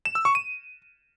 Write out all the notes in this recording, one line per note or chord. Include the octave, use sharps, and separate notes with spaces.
E7
E6
C#6
D#7